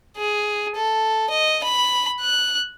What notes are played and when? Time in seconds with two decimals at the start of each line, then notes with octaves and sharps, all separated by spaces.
0.17 G#4
0.76 A4
1.30 D#5
1.64 B5
2.21 F#6